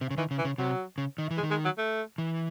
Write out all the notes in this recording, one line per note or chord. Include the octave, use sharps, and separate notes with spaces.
C3
C#3
D#3 E3
C#3
E3
C#3
C3 F#3
C#3
D#3
E3
G#3
D#3
G#3
F#3
A3
E3